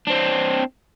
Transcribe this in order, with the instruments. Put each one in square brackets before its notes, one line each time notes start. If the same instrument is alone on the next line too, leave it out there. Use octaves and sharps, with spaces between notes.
[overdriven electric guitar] C4 D4